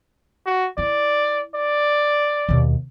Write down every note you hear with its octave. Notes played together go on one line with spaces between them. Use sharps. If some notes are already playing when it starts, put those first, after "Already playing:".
F#4
E4 D5
D5
D#2 B2